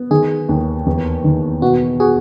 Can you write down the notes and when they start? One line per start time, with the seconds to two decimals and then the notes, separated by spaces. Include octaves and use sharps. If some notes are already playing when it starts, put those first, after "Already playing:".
Already playing: B3
0.11 D#3 G#4
0.49 D#2
0.86 E2
1.24 D#3
1.62 B2 F#4
2.00 F#4 G#4